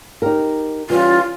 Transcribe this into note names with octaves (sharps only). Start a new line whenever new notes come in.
D#4 G4 A#4
E3 G3 C#4 F4